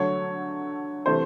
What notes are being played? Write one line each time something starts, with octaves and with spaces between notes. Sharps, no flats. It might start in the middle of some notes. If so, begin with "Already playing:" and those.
Already playing: D3 F#3 A3 C#5
C3 E3 A3 C5